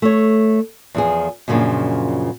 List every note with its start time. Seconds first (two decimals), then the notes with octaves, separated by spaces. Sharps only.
0.02 A3 C#5
0.94 E2 F3 G#4
1.48 F#2 A#2 C#3 F3 A#3 D4